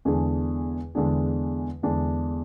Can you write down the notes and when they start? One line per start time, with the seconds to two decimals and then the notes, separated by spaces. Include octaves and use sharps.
0.05 E2 D3 G#3 D4 G#4
0.95 E2 D3 G#3 D4 G#4
1.83 E2 D3 G#3 D4 G#4